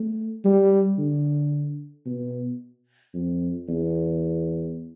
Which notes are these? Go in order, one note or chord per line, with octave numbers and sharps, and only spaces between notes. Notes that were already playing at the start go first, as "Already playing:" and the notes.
Already playing: A3
G3
D3
B2
F2
E2